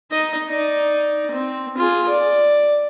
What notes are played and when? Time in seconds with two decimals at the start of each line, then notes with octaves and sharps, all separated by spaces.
0.12 D#4 D#5
0.49 D#4 D5
1.31 C4
1.77 F4 G#4
2.09 D5